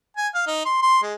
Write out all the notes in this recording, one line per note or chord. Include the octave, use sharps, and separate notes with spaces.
G#5
F5
D#4
C6
C6
G#3